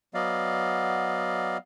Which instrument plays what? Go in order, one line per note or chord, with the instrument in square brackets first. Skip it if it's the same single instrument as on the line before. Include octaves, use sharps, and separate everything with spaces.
[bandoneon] F#3 B3 D5 D#5 F5